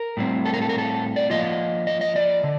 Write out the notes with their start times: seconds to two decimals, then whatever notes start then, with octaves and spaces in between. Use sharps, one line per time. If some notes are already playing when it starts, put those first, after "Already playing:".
Already playing: A#4
0.17 A2 G3 C4
0.46 A4
0.54 A#4
0.62 A4
0.69 A#4
0.78 A4
1.16 D5
1.30 F3 A#3 F4 D#5
1.87 D#5
2.01 D#5
2.16 D5
2.44 D3